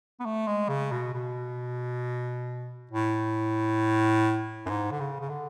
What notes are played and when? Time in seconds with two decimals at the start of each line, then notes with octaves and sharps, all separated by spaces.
0.20 B3
0.25 A3
0.47 G#3
0.69 C#3
0.92 B2
1.14 B2
2.91 A2
4.66 F#2
4.70 G#2
4.91 D3
5.00 C#3
5.21 C#3
5.29 D3